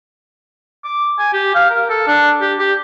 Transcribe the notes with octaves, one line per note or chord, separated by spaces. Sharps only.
D6
G#5
G4
F5
A#4
A4
D4
G4
G4